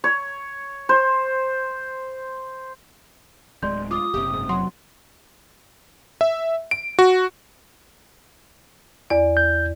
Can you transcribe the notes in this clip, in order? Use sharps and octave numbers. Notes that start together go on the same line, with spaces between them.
C#5
C5
D1 G#3 D5 C6 G6
F4 D6 D#6
F#1 C3 G4
G#2
F#3 F#5 C6
E5
D7
F#4
E2 D5
G6